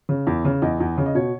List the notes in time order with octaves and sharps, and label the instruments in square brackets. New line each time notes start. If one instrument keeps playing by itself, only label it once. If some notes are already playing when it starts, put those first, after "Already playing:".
[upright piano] C#3
E2
C#3
E2 D#5
E2
C#3
D#5
B2 C#5